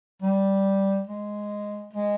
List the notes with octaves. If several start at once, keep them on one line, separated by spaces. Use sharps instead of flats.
G3
G#3
G#3